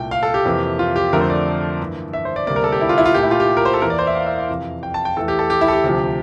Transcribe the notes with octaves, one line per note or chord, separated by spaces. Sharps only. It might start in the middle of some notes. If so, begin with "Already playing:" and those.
Already playing: C2 A#2 A3 G5
F5
A4
G4
F2 C3 E3 A#3
F4
G4
F2 D3 F3 A3 A#4
C5
D5
G2 E3 A#3
E5
C5
D5
D2 C3 G3 A#3 D5
A#4
A4
G4
E4
F4
E4
F4
A#2 A3 G4
E4
F4
G4
A#4
C5
A4
E2 E3 A#3 A#4
D5
C5
E5
F5
E5
F5
F2 C3 E3
G5
A5
G5
E2 E3 A3 A4
G4
A4
G4
E4
A4
G4
D2 C3 F3